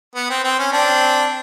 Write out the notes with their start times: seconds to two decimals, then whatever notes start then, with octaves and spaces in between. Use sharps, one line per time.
0.16 B3
0.30 C4
0.44 C4
0.59 C#4
0.73 C4 D4